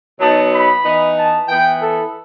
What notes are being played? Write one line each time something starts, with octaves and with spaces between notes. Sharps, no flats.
B2 F#3 B3 D#4 A5
B5
E3 B3 D#4
A5
E3 B3 E4 G5
A4